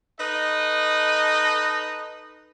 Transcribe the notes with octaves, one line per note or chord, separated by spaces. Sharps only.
D#4 A4 B4 D#5